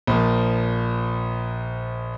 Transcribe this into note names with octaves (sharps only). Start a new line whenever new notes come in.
A#1 F3 A#3